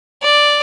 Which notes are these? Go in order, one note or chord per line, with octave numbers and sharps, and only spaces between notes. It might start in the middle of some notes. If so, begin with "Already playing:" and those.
D5